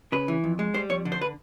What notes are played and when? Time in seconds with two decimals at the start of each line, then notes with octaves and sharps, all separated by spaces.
0.12 C#3 B4
0.28 E3
0.44 F2
0.59 G#3
0.74 G3 C5
0.89 F2 C#5
1.05 D3
1.12 C5
1.21 B4